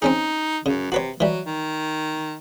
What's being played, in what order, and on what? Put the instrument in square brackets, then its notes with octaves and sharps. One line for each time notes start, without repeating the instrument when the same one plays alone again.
[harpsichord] C4 C#4 G#4 [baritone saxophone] D#4
[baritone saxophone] F#2 [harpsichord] C#3
[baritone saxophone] C3 [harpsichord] F#4 B4 C#5
[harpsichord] E3 G3 [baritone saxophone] F#3
[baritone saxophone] D#3